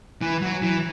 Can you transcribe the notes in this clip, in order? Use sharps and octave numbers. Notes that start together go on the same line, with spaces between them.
E3
F#3
E3